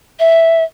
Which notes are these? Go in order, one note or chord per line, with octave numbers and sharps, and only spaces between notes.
E5